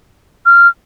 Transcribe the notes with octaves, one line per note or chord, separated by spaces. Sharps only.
F6